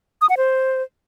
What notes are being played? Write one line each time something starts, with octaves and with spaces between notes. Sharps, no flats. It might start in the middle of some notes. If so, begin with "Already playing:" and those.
D#6
F#5
C5